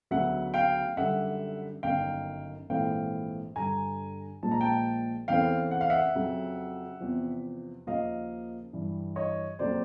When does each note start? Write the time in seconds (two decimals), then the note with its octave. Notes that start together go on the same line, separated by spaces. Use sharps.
0.11 D2 C#3 F#3 B3 E5 F#5
0.54 F5 G5
0.97 F#2 D3 G3 E5 F#5
1.83 G1 F#2 D#3 F5 G5
2.70 A#1 G#2 E3 A3 C4 F5 G5
3.56 G2 D3 G3 G#5 A#5
4.43 A#1 A#2 F3 G#3 A5
4.51 A#5
4.61 G5 A5
5.28 E2 C#3 E3 A3 C4 F5 G5
5.71 F#5
5.81 F5
5.90 E5 F#5
6.15 F2 C#3 F#3
7.00 E2 C3 F3
7.87 D#2 C#3 F3 A#3 D#5 F5
8.73 G2 E3 G3
9.16 C#5 D#5
9.59 F2 C#3 F#3 A#3 C5 D5